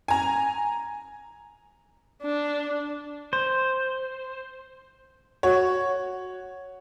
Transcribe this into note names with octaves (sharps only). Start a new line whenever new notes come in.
G#5 A#5
D4
C5
F#4 C#5